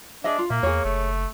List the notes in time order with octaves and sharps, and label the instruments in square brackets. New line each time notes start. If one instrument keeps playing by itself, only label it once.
[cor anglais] D4 [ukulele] G#4 D#5 E5
[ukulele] F4
[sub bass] A#2 [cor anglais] A#3 [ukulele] E5
[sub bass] E2 [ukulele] G#4 C#5
[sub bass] F#1 [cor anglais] A3